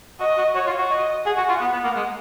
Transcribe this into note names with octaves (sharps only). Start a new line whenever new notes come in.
F#4 D#5
F#4
F#4 C#5
F4
F#4
D#5
G#4 F#5
F#4
F4
B3
B3
A#3
G#3